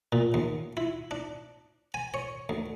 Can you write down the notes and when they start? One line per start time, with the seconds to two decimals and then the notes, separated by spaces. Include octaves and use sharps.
0.12 A#2
0.34 D#2
0.77 E4
1.11 D4
1.94 G#5
2.14 C#5
2.49 D2